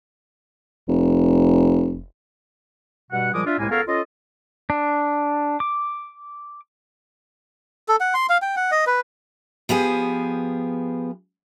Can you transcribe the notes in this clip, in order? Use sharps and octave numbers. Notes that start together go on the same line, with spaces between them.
F1
G2 B2 G3 F#5
A#2 F3 G3 G#3 D6 D#6
D4 F4 E5
C2 A2 G#3 A#3 G#5
C#2 B3 A4 A#4 C#5 F5
C#4 F4 A4 D#5
D4
D6
A4
F#5
C6
F5
G5
F#5
D#5
B4
F3 B3 G4 G#4